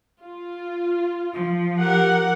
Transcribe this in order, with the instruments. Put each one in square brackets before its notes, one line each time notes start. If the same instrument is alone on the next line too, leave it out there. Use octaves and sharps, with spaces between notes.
[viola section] F4
[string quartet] F3
[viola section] G4 A#4 F#5